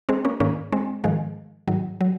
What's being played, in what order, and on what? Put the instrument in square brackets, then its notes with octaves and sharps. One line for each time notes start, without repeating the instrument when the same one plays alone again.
[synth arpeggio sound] G#3 C4
A#3 C#4
G#2 D#3 A#3 C#4
G#3 C4
G#2 D#3 F3 G#3
G#2 D#3 F#3
F#3